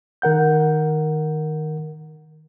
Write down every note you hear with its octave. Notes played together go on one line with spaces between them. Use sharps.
D#3 A#4 F#5 G6